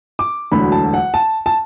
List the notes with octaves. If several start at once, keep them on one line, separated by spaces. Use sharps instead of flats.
D6
E1 D2 D3 F#3 B5
A5
F#5
A5
A5